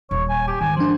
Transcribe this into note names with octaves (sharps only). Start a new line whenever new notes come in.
D#1 C#5
G#5
G4 A5
G#2 D#3 G#5
F3 D4 C5